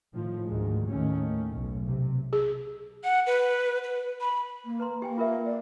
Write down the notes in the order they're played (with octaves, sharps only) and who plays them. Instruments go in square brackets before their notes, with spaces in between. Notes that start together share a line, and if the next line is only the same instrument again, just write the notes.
[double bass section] A2 D#3 F3
D2 G#2 D#3 G#3
D#2 A2 D#3 A3 C#4
B1
C3
[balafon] G#4
[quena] F#5
B4
B4
B5
[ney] A#3
[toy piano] B4 A#5 C6
[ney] A#3 [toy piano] G4 G5 G#5
[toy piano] F4 A#4 E5
[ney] D5